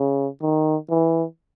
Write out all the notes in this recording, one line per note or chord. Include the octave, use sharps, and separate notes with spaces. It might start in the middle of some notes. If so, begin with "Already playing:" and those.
Already playing: C#3
D#3
E3